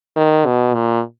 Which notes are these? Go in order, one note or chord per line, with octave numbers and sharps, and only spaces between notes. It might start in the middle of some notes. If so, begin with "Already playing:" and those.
D#3
B2
A#2